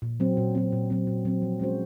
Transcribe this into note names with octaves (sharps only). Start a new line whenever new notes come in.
A#2
F#3 C4
A#2
F#3 C4
A#2
F#3 C4
A#2
F#3 C4
F3
G#3 C#4 F#4 C5